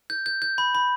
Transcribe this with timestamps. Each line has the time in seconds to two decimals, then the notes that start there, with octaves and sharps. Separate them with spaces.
0.10 G6
0.26 G6
0.42 G6
0.58 B5
0.75 B5